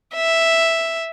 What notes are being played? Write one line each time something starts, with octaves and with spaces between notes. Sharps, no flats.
E5